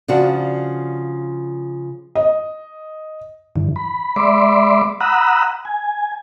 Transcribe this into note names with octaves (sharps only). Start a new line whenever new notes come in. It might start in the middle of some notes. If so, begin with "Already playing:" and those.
C#3 F3 D4 F#4
D#5
G2 D3 E3
B5
G#3 D5 E5 B5 C6 D6
F#5 A#5 B5 D#6 E6 F#6
G#5